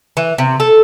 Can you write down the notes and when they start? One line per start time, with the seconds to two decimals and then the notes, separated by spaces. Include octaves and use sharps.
0.17 E3
0.38 C3
0.60 A4